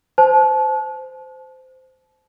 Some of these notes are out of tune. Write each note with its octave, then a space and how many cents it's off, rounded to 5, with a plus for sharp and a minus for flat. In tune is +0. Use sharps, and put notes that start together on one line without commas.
C5 -15 A5 -30